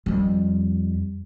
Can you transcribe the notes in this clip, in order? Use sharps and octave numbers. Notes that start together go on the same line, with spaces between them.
F2 G3